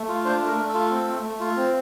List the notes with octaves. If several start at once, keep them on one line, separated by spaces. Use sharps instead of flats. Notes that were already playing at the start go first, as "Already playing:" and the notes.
Already playing: A3
F4
D4 C5
A3
A#4
A3
A4
F4
C4
A3
A3
F4
C4